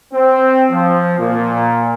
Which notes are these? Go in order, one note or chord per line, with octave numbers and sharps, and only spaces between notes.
C4
F3
A#2